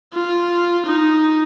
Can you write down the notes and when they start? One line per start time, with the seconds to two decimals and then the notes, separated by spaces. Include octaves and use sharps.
0.14 F4
0.86 D#4